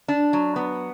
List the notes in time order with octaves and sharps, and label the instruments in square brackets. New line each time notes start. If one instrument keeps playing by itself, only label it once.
[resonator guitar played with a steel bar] D4
F#3
B3